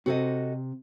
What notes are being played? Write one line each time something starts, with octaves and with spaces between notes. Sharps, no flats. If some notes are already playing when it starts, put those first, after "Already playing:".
C3 C4 F#4 A4 D#5